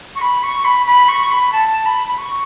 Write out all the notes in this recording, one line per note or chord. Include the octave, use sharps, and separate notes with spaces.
C#6
B5
C#6
B5
B5
C#6
B5
A5
B5
B5
C#6